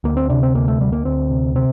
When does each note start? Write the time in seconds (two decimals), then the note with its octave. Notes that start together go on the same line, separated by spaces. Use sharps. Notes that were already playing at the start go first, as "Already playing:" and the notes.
0.04 D2 A#3
0.17 C4
0.30 C3 D4
0.43 C4
0.54 D2 A#3
0.68 A3
0.80 D2 G3
0.92 A#3
1.05 D2 C4
1.30 C3
1.55 C3 C4